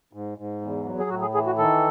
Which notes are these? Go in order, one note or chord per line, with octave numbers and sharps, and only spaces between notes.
G#2
G#2
E2
F#3
G#4
A2 F#4
G#4
E3 G#4
F#4
D#3 A4